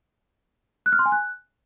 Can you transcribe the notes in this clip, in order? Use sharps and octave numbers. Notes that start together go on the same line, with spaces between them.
F#6
F6
C6
G#5
F#6